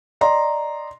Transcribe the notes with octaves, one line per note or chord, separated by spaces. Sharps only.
D5 D#5 A#5 C6